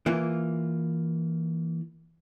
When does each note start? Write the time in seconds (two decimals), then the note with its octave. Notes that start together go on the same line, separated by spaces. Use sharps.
0.06 E3 A#3 F4